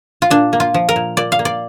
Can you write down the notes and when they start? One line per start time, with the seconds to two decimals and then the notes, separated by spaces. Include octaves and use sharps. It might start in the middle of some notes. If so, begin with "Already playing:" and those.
0.22 F4
0.30 A#2 D4
0.53 A#3
0.60 F4
0.74 F3
0.89 A#4
0.96 A#2
1.17 A#2 D5
1.32 F5
1.39 A#3
1.45 D5